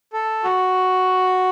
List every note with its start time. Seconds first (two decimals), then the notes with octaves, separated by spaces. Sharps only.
0.13 A4
0.44 F#4